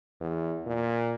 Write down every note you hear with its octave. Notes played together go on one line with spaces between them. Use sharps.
E2
A#2